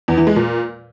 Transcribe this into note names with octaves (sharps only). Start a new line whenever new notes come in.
E2
E3
G#3
A#2